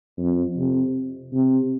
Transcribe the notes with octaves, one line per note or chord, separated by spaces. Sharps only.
F2
C3
C3